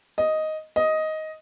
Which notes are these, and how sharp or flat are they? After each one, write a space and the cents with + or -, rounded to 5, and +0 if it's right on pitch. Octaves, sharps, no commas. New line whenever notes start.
D#5 +5
D#5 +10